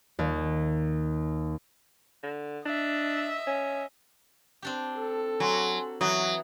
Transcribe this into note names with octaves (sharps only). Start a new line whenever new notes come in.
D#2
D3
D4 D#5 E5
C#4
C4 D4 G4
A4
F#3 G#5 C6
E3 F#3 D#6